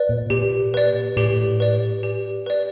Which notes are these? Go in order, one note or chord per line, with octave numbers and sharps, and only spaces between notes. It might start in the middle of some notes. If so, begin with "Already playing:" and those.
Already playing: B4 D5
A#2
A#2 G4
B4 D5
A2 G4
B4 D5
G4
B4 D5